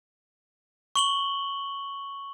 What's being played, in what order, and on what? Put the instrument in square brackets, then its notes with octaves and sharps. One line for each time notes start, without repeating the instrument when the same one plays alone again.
[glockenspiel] C#6 F#7 G7